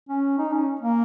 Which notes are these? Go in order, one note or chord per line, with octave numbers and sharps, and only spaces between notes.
C#4
D#4
C#4
A#3